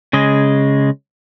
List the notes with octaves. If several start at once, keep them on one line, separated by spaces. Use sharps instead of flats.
C#3 G#3 D#5